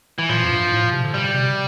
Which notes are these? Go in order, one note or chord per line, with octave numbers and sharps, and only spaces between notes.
E3
A#2 F3
F2
G2
A2
A#2
C3
D3
C3 G3
C3